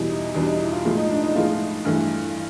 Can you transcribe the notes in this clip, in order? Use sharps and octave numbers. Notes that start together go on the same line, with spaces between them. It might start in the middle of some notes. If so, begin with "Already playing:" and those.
Already playing: E2 B2 G3 E4
D#4
E2 B2 G3 D4
D#4
E4
F4
A2 F3 G#3 E4
D#4
D4
D#4
A2 F3 G#3 F4
G2 E3 A3